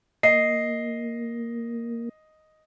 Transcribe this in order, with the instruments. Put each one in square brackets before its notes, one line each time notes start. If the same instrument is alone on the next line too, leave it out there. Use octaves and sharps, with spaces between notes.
[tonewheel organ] A#3 [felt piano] D#5 [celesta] C7